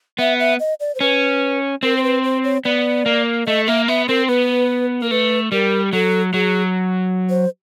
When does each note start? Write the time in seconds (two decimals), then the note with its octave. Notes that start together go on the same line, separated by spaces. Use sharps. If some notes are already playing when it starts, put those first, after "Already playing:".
0.19 B3 E5
0.40 E5
0.60 D#5
0.80 D5
0.95 C5
1.00 C#4 B4
1.83 C4 A#4
1.97 C5
2.04 B4
2.24 C5
2.44 C#5
2.65 B3 D5
3.06 A#3
3.47 A3 D#5
3.67 A#3 E5
3.88 B3 E5
4.08 C4 A#4
4.28 B3 B4
5.02 A#3 A#4
5.10 A3 B4
5.52 G3 A#4
5.93 F#3 A4
6.34 F#3 G#4
7.30 C5